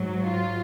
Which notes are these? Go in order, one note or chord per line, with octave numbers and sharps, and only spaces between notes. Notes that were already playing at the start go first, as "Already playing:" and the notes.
Already playing: G#2 F#3
F4